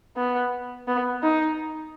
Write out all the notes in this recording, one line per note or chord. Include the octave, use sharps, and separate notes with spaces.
B3
B3
D#4